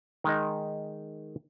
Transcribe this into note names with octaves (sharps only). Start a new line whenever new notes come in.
D#3 G#3 D#4